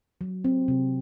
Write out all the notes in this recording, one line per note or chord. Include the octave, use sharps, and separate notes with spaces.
F#3
C4
C3